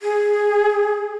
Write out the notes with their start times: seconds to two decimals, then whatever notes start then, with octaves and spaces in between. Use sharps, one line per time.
0.02 G#4